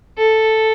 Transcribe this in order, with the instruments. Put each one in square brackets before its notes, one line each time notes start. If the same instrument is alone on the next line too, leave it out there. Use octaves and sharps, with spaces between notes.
[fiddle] A4